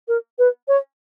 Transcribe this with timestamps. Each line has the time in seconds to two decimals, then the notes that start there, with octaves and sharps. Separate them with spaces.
0.08 A#4
0.39 B4
0.68 C#5